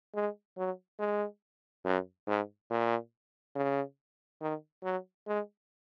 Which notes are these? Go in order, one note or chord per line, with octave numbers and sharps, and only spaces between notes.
G#3
F#3
G#3
F#2
G#2
A#2
C#3
D#3
F#3
G#3